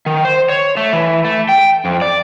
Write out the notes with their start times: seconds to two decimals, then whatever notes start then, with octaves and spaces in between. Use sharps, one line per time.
0.06 D#3
0.25 C5
0.49 C#5
0.77 A3
0.93 E3
1.25 A3
1.49 G5
1.85 F2
2.02 D5